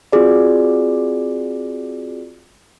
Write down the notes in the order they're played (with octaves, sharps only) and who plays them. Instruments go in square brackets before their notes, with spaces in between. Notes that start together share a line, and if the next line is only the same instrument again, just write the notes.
[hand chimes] C4 F4 F#4 G#4 D5